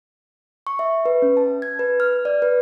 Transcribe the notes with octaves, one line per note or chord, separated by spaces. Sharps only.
C#6
E5
B4
C#4
A5
G#6
B4
F6
D5
B4